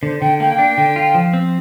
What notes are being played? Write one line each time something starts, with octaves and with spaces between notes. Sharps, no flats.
D3 C5
D3 G5
A#3 G5
D4
D3
F4
F3
C4